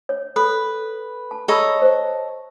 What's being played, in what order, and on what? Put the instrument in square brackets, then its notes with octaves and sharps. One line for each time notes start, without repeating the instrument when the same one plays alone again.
[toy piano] C#5
[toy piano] A4 [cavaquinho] B4
[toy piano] A5
[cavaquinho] A4 C#5 D#5 [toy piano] A#5 B5 E6
[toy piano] C5